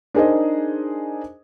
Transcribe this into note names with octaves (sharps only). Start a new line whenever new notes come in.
D4 D#4 G#4 A#4 C5 D#5